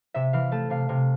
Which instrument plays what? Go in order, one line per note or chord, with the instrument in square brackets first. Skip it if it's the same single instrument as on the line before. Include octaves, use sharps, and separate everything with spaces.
[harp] C3 E5
E3 F5
A3 A5
C3 F5
C3 F5